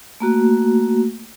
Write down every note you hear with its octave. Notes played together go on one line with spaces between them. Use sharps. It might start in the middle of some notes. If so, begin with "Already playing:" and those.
A3 A#3 F#4